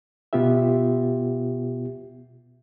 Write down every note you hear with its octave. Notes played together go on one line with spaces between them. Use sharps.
B2 B3 F4 G4 E5